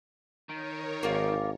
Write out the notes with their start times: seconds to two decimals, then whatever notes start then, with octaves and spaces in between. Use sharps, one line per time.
0.49 D#3 A#4 C#5
1.03 G#1 A#3 F4